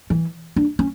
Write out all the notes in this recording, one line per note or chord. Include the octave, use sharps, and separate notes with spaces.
E3
D4
C#4